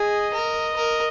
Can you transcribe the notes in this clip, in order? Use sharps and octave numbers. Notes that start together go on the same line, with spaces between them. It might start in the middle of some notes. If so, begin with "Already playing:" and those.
Already playing: G#4 D#5
A#4
A#4